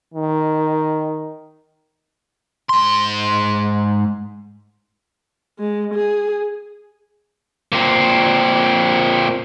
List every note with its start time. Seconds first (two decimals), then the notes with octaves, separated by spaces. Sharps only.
0.14 D#3
2.69 G#2 C6
5.59 G#3
5.94 G#4
7.72 A#2 C4